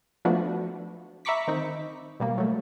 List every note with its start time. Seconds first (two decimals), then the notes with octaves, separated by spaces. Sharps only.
0.25 F3 A3 B3 D4 F#4
1.25 E5 A#5 B5 C#6 D6 B6
1.48 D#3 C4 D#4
2.20 B2 G3 A#3
2.38 F#3 A3